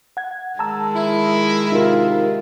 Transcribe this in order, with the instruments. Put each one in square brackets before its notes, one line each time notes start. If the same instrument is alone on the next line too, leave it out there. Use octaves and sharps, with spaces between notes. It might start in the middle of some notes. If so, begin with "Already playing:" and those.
[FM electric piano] F#5 G#6
[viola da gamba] D#3 G#3 [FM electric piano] A5 A#5 E6
[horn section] E4
[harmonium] C3 F4 [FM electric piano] D#4 A#4